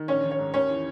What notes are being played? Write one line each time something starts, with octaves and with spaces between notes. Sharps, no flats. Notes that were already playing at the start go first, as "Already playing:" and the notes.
Already playing: D#3
A#1 C#4 C#5
D#3
C#4 C#5
G#2
D#2 C#4 C#5
E3